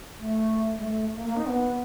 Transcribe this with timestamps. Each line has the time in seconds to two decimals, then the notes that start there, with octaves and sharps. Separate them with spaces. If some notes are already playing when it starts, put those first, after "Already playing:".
0.19 A3
0.78 G#3
0.83 A3
1.15 A#3
1.26 A#3
1.36 D#4
1.46 B3